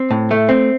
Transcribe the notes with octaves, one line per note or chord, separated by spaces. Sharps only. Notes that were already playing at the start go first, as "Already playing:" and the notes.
Already playing: C4
A2
A3
C4